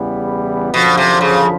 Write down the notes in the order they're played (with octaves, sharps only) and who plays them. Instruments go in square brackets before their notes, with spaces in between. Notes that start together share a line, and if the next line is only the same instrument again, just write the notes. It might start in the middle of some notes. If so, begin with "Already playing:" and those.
Already playing: [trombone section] E2 C#3 E3 G3 B3
[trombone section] F#2 D3 F3 [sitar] B2
[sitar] C3
C#3